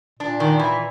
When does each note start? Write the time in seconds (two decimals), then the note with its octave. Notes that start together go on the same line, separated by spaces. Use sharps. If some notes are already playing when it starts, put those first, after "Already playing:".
0.19 A#2 D4
0.40 D#3
0.59 E3